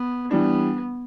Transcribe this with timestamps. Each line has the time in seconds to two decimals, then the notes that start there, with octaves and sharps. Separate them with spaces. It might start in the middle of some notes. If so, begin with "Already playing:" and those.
Already playing: B3
0.31 E3 G3 B3 D4